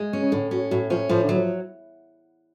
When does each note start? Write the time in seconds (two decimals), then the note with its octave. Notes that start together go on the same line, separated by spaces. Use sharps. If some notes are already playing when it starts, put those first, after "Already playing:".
Already playing: G#3
0.13 C#4
0.22 C#3
0.32 A2 D3
0.51 F#3 C#4
0.71 A2 F#3
0.90 F3 C#4
1.09 A2 F3
1.24 D3 F#3
1.37 F3